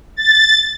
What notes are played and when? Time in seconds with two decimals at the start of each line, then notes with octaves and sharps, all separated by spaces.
0.16 A6